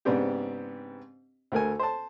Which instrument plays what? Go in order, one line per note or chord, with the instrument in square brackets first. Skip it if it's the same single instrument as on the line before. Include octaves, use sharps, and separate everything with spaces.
[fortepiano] G#2 C#3 B3 C4 D4 G4
D2 A3 A#4 G#5
C5 A5